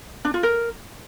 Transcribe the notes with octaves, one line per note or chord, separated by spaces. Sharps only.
D4
F4
A#4